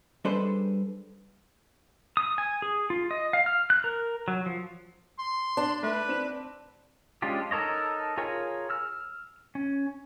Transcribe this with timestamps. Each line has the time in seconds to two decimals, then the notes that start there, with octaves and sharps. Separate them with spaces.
0.25 G3 D4 G#4 A4 B4 C5
2.17 D#6
2.38 G#5
2.62 G#4
2.90 F4
3.11 D#5
3.33 F5
3.46 F6
3.70 F#6
3.84 A#4
4.28 F#3
4.46 F3
5.19 C6
5.57 D4
5.83 A3 B4
6.09 C4 E7
7.22 G#3 C#4 D4 F4 G4
7.51 D#4 A4 A#4 C#5 D#5
8.17 F4 G#4 A#4 C#5 G#5
8.70 E6 F6
9.55 C#4